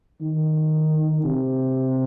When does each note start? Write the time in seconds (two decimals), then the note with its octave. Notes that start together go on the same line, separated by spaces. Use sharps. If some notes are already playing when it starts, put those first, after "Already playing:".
0.21 D#3
1.24 C3